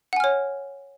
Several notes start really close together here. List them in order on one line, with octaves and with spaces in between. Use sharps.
F#5 G#5 F6 C#5